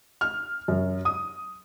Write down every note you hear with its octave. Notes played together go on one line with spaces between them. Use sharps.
F6
F#2
D#6